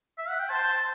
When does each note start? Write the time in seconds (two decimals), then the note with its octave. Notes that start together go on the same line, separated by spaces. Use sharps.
0.18 E5
0.29 F#5
0.39 G5
0.50 C5 A5